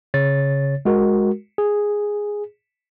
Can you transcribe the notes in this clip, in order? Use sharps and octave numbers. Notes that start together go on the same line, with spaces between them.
C#3 C#5 A6
G#3 F#4 A#4
G#4